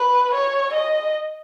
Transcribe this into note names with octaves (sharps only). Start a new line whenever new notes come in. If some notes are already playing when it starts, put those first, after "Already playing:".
Already playing: B4
C#5
D#5